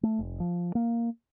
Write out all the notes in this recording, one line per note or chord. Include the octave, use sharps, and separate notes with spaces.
A3
F1
F3
A#3